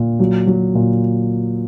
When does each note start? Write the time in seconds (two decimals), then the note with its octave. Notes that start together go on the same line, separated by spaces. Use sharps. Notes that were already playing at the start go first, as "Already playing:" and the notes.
Already playing: A#2
0.20 F#3
0.47 F#3
0.75 A#2